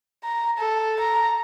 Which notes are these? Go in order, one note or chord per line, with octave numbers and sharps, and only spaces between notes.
A#5
A4
A#5